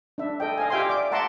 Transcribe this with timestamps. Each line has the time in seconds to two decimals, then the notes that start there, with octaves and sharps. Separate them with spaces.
0.18 D4 E5
0.40 A4 D#5 G5
0.58 D#5 F5 G#5
0.70 G4 E5 F5 G5 G#5 C6
0.89 D5 F5 D6
1.11 E5 F#5 A5 A#5 C6 D6